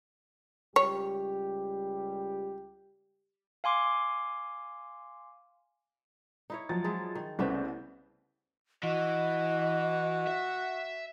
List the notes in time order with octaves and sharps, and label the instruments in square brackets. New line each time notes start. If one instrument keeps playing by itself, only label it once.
[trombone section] C#2 G3 G4 [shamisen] C#5
[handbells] F5 G#5 C6 D6
[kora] D#4 E4 C#5
[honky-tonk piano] F3 F#3 A6
[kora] G#3 D#4 E4
D#3
[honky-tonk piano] C2 C#3 C5 [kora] A3 B3 E5
[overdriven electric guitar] E3 [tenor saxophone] F#4 [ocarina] D#5
[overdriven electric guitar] E5